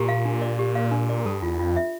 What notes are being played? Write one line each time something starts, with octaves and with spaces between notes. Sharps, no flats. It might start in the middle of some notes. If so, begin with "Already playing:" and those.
Already playing: A#2 G4
F5
D4
D5
G4
F5
D4
D5
G2 A4
E2 F4
F2 F4
E5